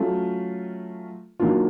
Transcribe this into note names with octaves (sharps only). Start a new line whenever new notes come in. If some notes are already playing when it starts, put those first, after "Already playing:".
Already playing: F#3 A3 C#4 F4
D#3 F#3 A#3 D4 F4